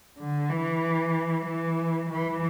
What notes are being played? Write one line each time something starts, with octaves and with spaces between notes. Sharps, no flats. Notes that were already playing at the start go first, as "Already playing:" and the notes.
D3
E3
E3
E3